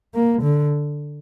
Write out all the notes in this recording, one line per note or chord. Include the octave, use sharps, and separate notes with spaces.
A#3
D3